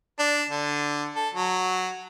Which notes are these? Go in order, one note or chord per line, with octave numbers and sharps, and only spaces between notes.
D4
D3
A4
F#3